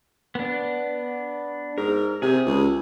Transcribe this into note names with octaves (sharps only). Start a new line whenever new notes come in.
B3 D4
G#2 A#4
C3 G#4
C#2